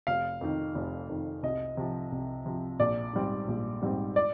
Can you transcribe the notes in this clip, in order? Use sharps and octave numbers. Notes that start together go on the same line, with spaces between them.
F1 F5
F2 D#3
F1
F2 D#3
C2 D#5
C3 F3
C2
C3 F3
A#1 D5
G#2 G3 C4
A#1
G#2 G3 C4
D5